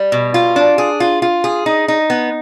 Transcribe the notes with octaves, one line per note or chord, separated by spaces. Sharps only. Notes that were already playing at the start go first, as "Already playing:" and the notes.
Already playing: G3
B2
F4
D4
G#4
F4
F4
G#4
D#4
D#4
B3